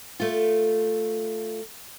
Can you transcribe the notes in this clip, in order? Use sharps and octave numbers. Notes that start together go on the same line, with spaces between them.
A3 F4